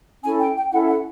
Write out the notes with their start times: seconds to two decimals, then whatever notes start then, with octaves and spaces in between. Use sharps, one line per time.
0.23 C#4 E4 A4 G#5
0.40 G5
0.56 G5
0.71 C#4 E4 A4 F#5
0.88 F#5